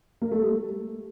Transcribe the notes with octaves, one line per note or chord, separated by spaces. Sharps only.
A#3
A3
G3